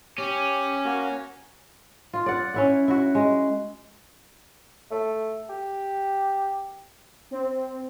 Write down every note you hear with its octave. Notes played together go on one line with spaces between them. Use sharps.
C#4 G4
A#3 F#4
F4
D5 F#5
C#4 E4 F#5
E4 F#4
G#3
A3
G4
C4